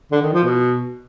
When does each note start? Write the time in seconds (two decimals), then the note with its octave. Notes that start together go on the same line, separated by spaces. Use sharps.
0.11 D3
0.22 D#3
0.33 F3
0.43 B2